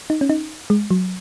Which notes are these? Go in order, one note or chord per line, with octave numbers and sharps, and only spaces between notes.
D#4
C#4
D#4
G#3
F#3